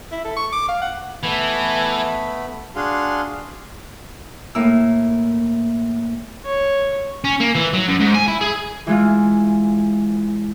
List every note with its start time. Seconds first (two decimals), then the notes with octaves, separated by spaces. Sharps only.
0.12 E4
0.24 A4
0.36 C#6
0.52 D6
0.69 F5
0.82 F#5
1.23 E3 A3 B3 B5
2.76 D4 F#4 G#4 F5 C6
4.55 A2 A#3 E4 E6
6.45 C#5
7.24 C#4
7.40 A#3
7.55 E3
7.73 F#3
7.88 F#2
8.00 G#2
8.14 G#5
8.28 E4
8.41 G#4
8.87 E3 G#3 F4